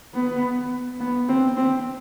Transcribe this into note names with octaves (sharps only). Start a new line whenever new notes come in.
B3
B3
C4
C4